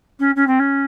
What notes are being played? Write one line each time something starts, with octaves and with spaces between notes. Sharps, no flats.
C#4
C#4
C4
C#4